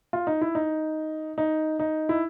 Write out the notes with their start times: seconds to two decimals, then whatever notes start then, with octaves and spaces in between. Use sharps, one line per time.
0.13 F4
0.27 D#4
0.41 E4
0.55 D#4
1.38 D#4
1.80 D#4
2.09 E4